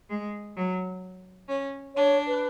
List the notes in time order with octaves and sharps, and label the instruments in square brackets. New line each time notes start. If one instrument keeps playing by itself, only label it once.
[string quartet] G#3
F#3
C#4
[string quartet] D4 [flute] C#5
[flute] B4